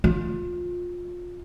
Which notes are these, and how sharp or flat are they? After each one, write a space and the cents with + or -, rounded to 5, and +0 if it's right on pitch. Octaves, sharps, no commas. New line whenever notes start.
F4 +20